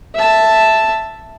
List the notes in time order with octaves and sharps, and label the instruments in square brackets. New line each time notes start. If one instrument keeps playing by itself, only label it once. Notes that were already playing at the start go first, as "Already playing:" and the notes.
[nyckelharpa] E5 A5